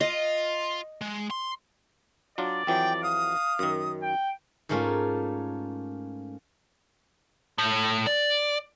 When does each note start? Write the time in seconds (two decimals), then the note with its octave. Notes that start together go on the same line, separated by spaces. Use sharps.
0.01 F4 D#5
1.01 G#3
1.31 C6
2.38 F#3 D4 F4 D5
2.67 F2 E3 F#3 G5
3.03 F5 D#6
3.59 F#2 D#3
4.02 G5
4.69 G#2 A3 A#3 C#4 F4
7.58 A2
8.07 D5